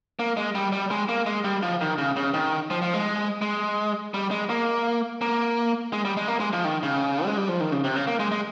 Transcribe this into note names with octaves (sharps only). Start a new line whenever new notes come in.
A#3
G#3
G3
G3
G#3
A#3
G#3
G3
F3
D#3
C#3
C#3
D#3
F3
F3
G#3
G#3
G3
G#3
A#3
A#3
G#3
G3
G#3
A#3
G#3
F3
D#3
C#3
G#3
G3
F3
D#3
C#3
C3
C#3
A#3
G#3
G#3